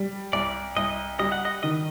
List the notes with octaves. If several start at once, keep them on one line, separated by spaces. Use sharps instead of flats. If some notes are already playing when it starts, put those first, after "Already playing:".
Already playing: G3
C2 D5
C2 D#5
G3 D#5
F#5
D#5
D#3 D#5